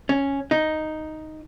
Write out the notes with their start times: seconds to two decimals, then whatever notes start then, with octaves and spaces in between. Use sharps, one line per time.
0.09 C#4
0.51 D#4